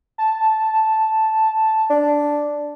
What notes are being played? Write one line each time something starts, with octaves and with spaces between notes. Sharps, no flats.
A5
D4